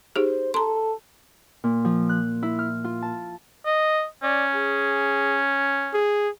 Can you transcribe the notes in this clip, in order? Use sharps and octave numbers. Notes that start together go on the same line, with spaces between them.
D#4 G4 G#4 C5
A4 A#5 C6
A#2
F3
F#6
E4
F6
F4
A5
D#5
C#4 D5
G#4
G#4